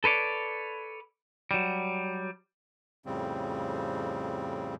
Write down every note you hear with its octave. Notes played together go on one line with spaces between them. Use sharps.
A4 B4 C#5 D5
F#3 G3
F2 A2 C#3 G3 C4